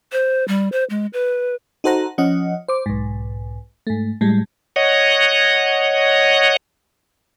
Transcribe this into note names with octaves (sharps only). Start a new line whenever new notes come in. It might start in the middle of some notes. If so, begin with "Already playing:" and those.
C5
G3
C5
G#3
B4
D#4 F#4 A4 C5 F#5 A#5
F3 C#4 D#5 F#5
C5 D6
B1 G#2
G#2 A3
A2 G3 G#3
C#5 D#5 F#5